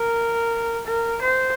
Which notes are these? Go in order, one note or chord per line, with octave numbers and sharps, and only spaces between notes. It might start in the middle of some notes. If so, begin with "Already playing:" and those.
Already playing: A#4
A#4
C5